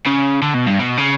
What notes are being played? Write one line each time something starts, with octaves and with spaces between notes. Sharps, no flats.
C#3
D3
B2
G2
B2
C#3